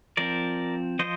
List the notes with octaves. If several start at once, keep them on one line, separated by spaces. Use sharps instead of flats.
F3 C4 A#4 D5
F3 C5 D#5